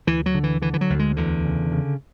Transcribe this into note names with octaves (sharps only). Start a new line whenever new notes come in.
D2 E3
F#3
D3
E3
D3 E3
E3
F#3
D2
G#3
E2 D3
C#3
C#3